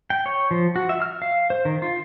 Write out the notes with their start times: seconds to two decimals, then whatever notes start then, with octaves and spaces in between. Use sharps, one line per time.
0.10 G5
0.26 C#5
0.51 F3
0.76 F#4
0.89 E5
1.02 F6
1.22 F5
1.50 C5
1.65 D#3
1.82 F4